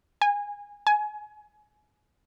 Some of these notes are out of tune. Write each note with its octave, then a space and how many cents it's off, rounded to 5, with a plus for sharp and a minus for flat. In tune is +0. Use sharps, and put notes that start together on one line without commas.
G#5 -20
G#5 +25